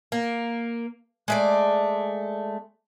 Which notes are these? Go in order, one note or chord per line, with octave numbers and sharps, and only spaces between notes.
A#3
G#3 A3 D5